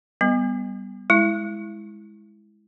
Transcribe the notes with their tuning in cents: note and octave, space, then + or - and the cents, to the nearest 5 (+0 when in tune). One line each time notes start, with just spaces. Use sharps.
G3 +0 B3 +0
G#3 +0 E4 +0